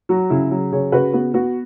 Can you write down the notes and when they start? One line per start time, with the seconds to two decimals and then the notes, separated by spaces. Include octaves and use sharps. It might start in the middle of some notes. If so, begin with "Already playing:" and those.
0.09 F#3 F#4
0.30 C#3 E4 G#4
0.51 F#3
0.72 C#3 G#4 C#5
0.92 C#3 F#4 B4
1.13 B3 F#4
1.34 B3 F#4